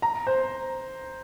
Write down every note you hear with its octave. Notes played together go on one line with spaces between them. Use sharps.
A#5
C5